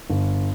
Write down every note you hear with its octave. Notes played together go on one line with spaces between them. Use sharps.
G1